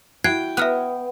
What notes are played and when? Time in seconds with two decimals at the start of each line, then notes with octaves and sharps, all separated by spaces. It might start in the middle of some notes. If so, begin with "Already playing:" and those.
0.24 E4 F#4 G5 F#6 G#6 C7
0.57 B3 E5 F6 F#6